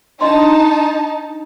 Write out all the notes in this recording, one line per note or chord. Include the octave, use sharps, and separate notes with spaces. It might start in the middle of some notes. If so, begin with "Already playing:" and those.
D4 D#4 D#5 A5 C6